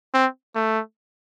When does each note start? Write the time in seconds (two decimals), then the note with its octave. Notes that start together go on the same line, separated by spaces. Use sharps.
0.14 C4
0.55 A3